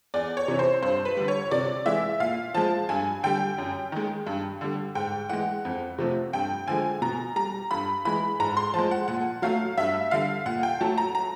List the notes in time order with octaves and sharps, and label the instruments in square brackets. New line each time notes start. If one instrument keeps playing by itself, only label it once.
[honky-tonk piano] E2 D5
C#5
C3 E3
C5
G2 C5
B4
D3 G3
C#5
C3 D5
E3 G#3 E5
A#2 F5
F3 G#3 A5
G2 G#5
D3 G3 G5
F#2
D#3 G#3
G2
D3 G3
G#2 G5
E3 G#3 F#5
F2
C3 F3 A3
G2 G5
D3 F3 G#3 G#5
B2 A#5
G3 A#5
G2 B5
E3 G#3 B5
G#2 A#5
C6
F3 G#3 A5
F#5
A#2 F#5
F#3 A3 F5
G2 E5
D3 G3 F5
A#2 F#5
G5
F#3 A3 A5
A#5
A#5